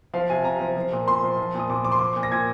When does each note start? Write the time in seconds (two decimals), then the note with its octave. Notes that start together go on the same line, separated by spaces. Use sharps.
0.14 F3 F5
0.30 C3 G#5
0.44 C3 A#5
0.60 F3
0.76 F3
0.92 A#2
1.07 A#2 C6
1.23 F3
1.38 F3
1.54 A#2 D#6
1.70 A#2 D6
1.84 F3 D6
1.92 C6
1.99 F3 D6
2.16 A#2
2.23 A#6
2.32 A#2 G#6